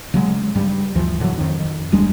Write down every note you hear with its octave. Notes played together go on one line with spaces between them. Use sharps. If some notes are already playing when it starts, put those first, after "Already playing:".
C#3 F#3 G#3
G2 G3
D2 E3 F3
A2 D3 E3 F#3
F2 D#3
D1 G3 G#3 D4